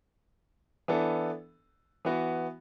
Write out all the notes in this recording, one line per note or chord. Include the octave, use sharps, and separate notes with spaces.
E3 B3 D4 A4
E3 B3 F#4